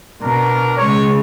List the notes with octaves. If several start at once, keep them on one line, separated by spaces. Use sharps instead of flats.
B2 D4 A#4 A#5
C#3 G#3 C#5